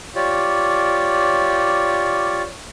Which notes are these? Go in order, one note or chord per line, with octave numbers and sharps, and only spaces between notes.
F4 G4 C#5 D5